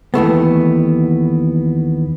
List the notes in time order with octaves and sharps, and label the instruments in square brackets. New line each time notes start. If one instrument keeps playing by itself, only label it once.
[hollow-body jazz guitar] D#2 E3 A3 B3